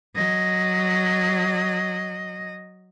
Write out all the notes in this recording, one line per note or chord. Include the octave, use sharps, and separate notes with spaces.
F#3 D#5